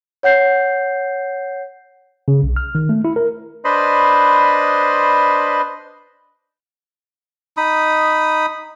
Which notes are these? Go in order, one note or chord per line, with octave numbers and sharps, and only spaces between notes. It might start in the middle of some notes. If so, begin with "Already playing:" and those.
C#5 F#5 G6 C7
C#3
B1
F6
D#3
A3
E4
A#4
D4 B4 C5 D#5 B5 C6
D#4 B5 D#6